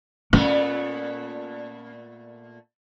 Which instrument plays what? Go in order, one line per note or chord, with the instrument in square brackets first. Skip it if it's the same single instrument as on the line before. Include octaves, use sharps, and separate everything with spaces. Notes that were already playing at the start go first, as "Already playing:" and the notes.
[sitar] A#2 A3 B3 [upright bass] C#4